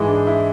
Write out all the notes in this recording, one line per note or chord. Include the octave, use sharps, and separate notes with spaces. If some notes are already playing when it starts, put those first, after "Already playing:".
Already playing: G#2 E3 G#3
D4
E4